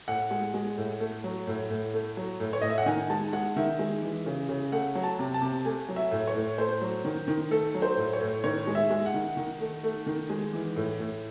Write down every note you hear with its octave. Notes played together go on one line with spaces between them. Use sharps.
A2 F#5
G#3
G#3
A2
A3
F#3
A2
A2
A3
F#3
A2
C#5
A2 D#5
E5
F#5
D#3 G#5
G#3 A5
G#3 F#5
D#3 E5
G#3
E3
C#3
C#3
A3 F#5
F#3
A5
C3
A5
C3
A3 G#5
F#3
E5
A2
C#5
A2
A3 C5
F#3
D#3
D#3
A3 A4
F#3
C5
A2
C#5
A2
D#3 C#5
G#3
E5
G#3
F#5
D#3
D#3
A3
A3
D#3
G#3
E3
A2
A2